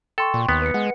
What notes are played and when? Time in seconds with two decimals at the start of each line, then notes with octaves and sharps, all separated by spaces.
0.18 A4 G5 C6 C#6
0.34 A#2
0.49 D#2 B3
0.62 B4 C#7
0.74 G#3 F#5